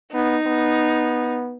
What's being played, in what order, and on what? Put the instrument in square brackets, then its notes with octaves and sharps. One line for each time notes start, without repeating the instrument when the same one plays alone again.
[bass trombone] B3 [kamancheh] D#4
[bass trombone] B3